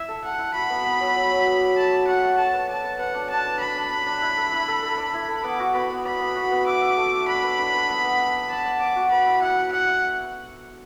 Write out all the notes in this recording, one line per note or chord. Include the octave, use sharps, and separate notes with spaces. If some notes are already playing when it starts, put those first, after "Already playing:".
Already playing: E4 E5
A4
A4 F#5
E4
F#4 B5
B3
B3
F#3
F#3
F#3
B3
D5
A3 A5
D5
F#4 F#5
A3
A3 A5
B4
D5 A5
B4
B4 F#5
D4
D4 A5
B4
D4 B5
D4
D4
D4
E4
A4
E4
A4
A4
D5
E4
A4
B3 D6
F#4
B3 B5
B3
D5 B5
B3
F#4
B3
E5 D6
E5
A3
E5
D4 B5
B4
D4
B4
B3
B3
B3
D5
D5 A5
D5
D5 D6
F#4
B4 B5
E4
E4 F#5
E4
D5 F#5
E4